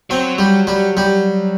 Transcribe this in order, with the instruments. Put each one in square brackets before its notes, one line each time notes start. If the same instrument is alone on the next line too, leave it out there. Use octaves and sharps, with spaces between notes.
[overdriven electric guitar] F#3 [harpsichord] C4
[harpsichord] G3
G3
G3